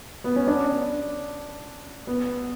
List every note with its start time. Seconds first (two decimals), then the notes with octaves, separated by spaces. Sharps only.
0.24 B3
0.36 C#4
0.47 D4
2.07 B3